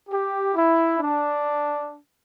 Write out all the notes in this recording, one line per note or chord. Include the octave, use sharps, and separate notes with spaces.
G4
E4
D4